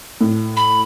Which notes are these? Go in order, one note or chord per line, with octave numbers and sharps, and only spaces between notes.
A2
B5